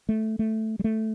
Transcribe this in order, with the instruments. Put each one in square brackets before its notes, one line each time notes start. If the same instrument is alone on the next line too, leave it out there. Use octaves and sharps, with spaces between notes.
[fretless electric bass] A3
A3
G3
A3